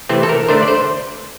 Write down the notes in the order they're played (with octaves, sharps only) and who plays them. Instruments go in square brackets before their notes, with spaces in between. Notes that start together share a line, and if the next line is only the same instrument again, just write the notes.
[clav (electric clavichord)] C3 E3 A3 C4
A4
A#4
D3 A3 D4 C5
D5
C5